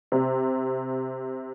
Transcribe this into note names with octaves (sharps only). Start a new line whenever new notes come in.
C3